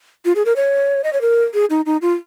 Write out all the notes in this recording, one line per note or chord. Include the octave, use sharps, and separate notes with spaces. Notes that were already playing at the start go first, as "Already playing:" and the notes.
F4
G#4
A#4
C#5
D#5
C#5
A#4
G#4
D#4
D#4
F4